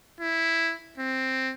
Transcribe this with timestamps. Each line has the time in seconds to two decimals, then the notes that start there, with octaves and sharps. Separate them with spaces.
0.20 E4
0.98 C4